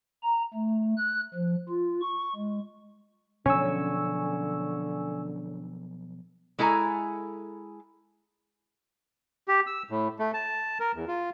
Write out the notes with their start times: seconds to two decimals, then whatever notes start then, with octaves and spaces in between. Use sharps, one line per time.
0.23 A#5
0.54 A3
0.97 F#6
1.34 F3
1.69 F4
2.02 C#6
2.36 G#3
3.46 B2 D3 F3 F#3 C#4 G#5 C#6 E6
6.59 G#3 E4 A4 G#5 A#5
9.48 G4
9.67 E6
9.90 A2
10.19 A3
10.34 A5
10.80 A#4
10.95 E2
11.08 F4